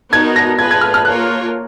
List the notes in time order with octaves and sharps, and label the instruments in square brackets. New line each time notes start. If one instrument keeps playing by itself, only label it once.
[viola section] B3 D#4 F#4 A#4 [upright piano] G#6
[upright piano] A#6
[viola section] B3 F4 G#4 B4 [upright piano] G#6
[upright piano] G#6
F6
F6
[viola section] A#3 F4 A#4 C#5 [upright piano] F#6